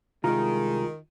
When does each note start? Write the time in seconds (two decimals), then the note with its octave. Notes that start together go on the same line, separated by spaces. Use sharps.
0.24 C2 D#3 G#3 F4 A#5